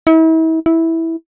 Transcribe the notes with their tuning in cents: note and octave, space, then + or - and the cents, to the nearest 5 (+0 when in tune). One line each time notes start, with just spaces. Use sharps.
E4 -40
E4 -10